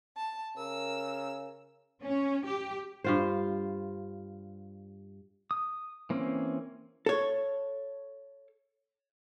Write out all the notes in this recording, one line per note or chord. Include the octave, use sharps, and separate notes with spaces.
A5
C#3 A#4 E6
C#4
G4
G2 F4 C5
D#6
E3 A#3 C4 C#4
A4 C#5